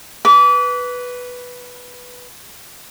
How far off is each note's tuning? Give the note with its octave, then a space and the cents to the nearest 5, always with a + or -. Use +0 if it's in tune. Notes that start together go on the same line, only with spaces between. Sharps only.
B4 +0 D6 -35